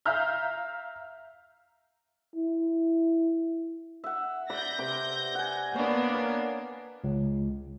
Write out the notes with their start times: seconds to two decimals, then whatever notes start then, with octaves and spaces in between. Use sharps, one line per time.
0.06 E5 F5 A#5 F6 G6
2.36 E4
4.04 E5 F#5
4.50 D5 F#5 B5 G6 A#6
4.78 C3 B4 D6
5.35 F#5 G#5
5.76 A#3 B3 D4 C#5
6.14 A#4
7.04 C#2